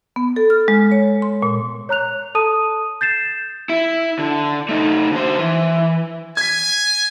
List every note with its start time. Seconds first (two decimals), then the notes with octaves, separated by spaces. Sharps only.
0.16 B3
0.36 A4
0.50 F6
0.68 G#3
0.92 C#5
1.22 C6
1.43 A#2
1.89 C#5 A#5 F#6 F7
2.35 A4 A5 D#6 D#7
3.01 G6 A6 C7 E7
3.69 E4
4.19 D3
4.69 A3 D#4
5.12 D3 C5
5.38 E3
6.37 G#5 G#6 B6